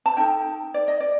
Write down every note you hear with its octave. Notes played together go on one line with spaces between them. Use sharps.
A5
D#4 A4 G5
D5
D#5
D5